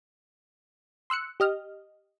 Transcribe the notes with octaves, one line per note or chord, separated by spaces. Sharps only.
C6 E6 F#6 C#7
G4 D#5 F6